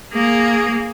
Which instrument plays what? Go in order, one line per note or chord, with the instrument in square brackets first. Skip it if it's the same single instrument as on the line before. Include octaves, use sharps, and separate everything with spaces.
[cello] A#3 G#4